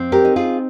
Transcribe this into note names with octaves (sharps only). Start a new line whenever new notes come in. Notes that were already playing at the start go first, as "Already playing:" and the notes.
Already playing: F2 C4
G4 A#4
D#4
F4 G#4